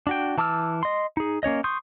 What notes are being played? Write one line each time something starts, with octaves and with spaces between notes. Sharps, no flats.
D4 F#4 G5
E3 A5 D6 E6 F6
D#5 C6
D#4 G#4
A#3 C#4 C#5 D#5
C6 C#6 D#6 G6